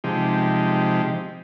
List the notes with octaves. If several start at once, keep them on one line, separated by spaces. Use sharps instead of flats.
C3 F3 G#3 D#4 G4